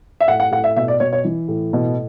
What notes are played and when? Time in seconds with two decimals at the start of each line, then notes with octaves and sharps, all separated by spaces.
0.20 E5
0.28 A2 F#5
0.40 F#5
0.51 A2 F#5
0.64 E5
0.76 B2 E5
0.88 D5
1.00 B2 C#5
1.13 C#5
1.24 E3
1.48 A2
1.73 B2